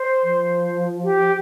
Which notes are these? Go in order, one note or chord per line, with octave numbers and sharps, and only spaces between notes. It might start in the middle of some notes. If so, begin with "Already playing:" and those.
Already playing: C5
F3
G4